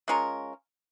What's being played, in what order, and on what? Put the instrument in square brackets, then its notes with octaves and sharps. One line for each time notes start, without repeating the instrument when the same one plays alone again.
[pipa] G#3 C#4 F4 A#4